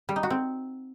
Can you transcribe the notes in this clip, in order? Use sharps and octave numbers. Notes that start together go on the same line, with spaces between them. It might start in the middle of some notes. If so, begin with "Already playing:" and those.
G3
D#4
F#4
C4